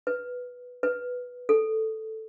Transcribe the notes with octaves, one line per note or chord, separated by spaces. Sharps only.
B4
B4
A4